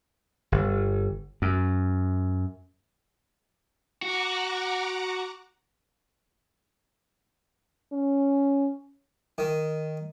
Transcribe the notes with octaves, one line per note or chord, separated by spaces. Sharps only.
G1
F#2
F#4 F#5 A#5 D6
C#4
D#3